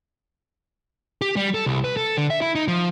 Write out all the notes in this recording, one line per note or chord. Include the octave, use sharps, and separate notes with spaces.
G4
G3
A4
C2
B4
A4
D3
E5
E4
D#4
F3